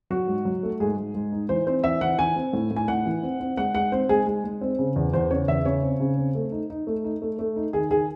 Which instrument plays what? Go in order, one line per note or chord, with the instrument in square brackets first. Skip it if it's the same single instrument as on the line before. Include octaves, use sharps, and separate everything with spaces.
[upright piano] F#3 F#4
G#2
F#3
A3
G#2 G#4
G#2
G#2
D#4
E3 C5
C4 C5
E3 E5
E3 F#5
E3 G#5
C4
A2
A2
G#5
A2 F#5
E3
C4
C4
G#3 F#5
G#3 F#5
C4 C5
G#3 G#4
G#3
G#3
C4
C#3
E2
E2 C5
C#3 C#5
E2 E5
C#3 C#5
C4
C#3
C4
A3
D#4
D#4
A3
D#4
A3
A3
D#4
D#3 G#4
D#3 G#4